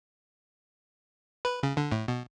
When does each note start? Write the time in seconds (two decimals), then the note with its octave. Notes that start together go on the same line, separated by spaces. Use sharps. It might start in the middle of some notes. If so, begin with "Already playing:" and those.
1.45 B4
1.63 C#3
1.77 D3
1.92 A2
2.08 B2